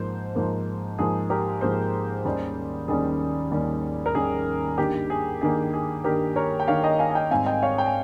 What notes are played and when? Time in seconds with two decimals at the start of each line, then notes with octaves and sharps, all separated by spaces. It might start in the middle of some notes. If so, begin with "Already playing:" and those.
Already playing: G#2 F3 A#3 C5
0.35 G#2 F3 A#3
0.98 G#2 F3 A#3 G#4
1.30 G4 A#4
1.61 G#2 F3 A#3 G#4 C5
2.25 D#2 D#3 G3 A#3 C#4
2.88 D#2 D#3 G3 A#3 C#4 G#4
3.51 D#2 D#3 G3 A#3 C#4
4.06 A#4
4.15 D#2 D#3 G3 A#3 C#4 G#4
4.78 G2 D#3 A#3 G4
5.10 G#4
5.41 G2 D#3 A#3 G#4
5.73 G#4
6.04 G2 D#3 A#3 G4 A#4
6.36 A#4 C#5
6.60 G5
6.68 G2 D#3 A#3 C#5 F5
6.84 D#5 G5
6.99 F5 G#5
7.10 G#5
7.15 D#5 G5
7.31 G#2 G3 C4 F5 G#5
7.46 D#5 G5
7.63 C#5 F5
7.78 G5
7.86 G#5